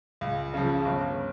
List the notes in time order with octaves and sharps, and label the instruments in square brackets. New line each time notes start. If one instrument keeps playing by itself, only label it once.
[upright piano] C#2
C#3 F3
G1